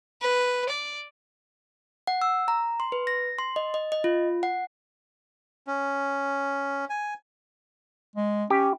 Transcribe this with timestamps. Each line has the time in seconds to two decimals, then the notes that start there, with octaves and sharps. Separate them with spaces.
0.22 B4
0.69 D5
2.07 F#5
2.22 E6
2.48 A#5
2.80 C6
2.92 B4
3.07 A#6
3.39 C6
3.56 D#5
3.74 D#5
3.92 D#5
4.04 F4
4.43 F#5
5.67 C#4
6.90 G#5
8.16 G#3
8.50 C#4 G4